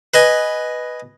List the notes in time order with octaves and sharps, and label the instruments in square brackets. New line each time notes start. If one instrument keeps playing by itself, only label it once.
[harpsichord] B4 D#5 G#5